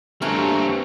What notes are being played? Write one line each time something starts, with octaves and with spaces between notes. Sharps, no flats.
G2 A3 A#3 C4 F#4 C#5 G#5